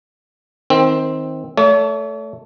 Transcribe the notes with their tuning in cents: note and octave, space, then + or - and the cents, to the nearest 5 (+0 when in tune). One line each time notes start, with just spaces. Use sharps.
D#3 +25 C4 +5
A3 +0 C#5 +45